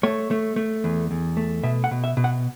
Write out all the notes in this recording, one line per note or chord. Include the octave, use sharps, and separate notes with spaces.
A3 C#5
A3
A3
E2
E2
A3
B2 E5
F#5
B2
E5
B2
F#5